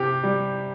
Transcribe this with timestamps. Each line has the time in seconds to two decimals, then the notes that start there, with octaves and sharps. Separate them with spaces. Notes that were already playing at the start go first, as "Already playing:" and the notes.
Already playing: C3 G4
0.23 G3